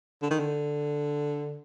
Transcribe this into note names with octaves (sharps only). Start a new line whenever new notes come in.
D3
D#3
D3